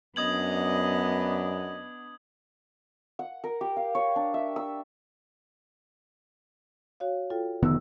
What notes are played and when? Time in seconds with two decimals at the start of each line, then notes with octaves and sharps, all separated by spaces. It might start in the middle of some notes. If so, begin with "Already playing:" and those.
0.16 F#2 B3 D4 D#5 D#6 G#6 F#7
3.19 F#5
3.44 A#4
3.61 G4
3.76 F5
3.95 C#5
4.16 D4
4.34 E5
4.56 E6
7.00 F#4 C#5 F5
7.30 F4 A4 G5
7.63 F1 D3 D#3 B3 E6